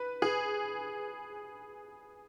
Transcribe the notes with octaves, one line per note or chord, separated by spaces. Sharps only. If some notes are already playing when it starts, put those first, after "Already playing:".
Already playing: B4
G#4